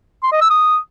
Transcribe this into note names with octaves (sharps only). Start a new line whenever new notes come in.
C6
D#5
E6
D#6